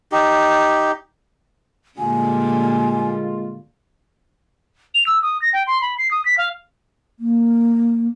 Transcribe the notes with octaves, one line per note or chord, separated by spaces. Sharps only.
D#4 G4
A#2 D3 G3 G#3 A#3 F4 G#5
F7
E6
D#6
A#6
G5
C6
B5
C7
D#6
B6
F5
A#3